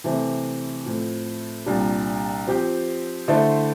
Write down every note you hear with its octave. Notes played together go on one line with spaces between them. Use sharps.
C3 E3 A3 C4
A2 F3 C4
C2 A#2 G3 D4
F3 C4 G4
D3 A3 E4 A4 C5